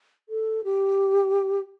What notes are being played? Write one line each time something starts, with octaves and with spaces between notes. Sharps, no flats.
A4
G4